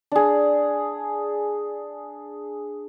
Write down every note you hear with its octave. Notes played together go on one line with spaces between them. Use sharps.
D4 G#4